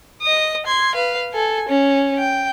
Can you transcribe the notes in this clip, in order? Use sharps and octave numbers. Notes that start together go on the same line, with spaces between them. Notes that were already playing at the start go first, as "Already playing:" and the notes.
D#5 D#6
C6 G#6
B4 F5
A4 G#5
C#4
G5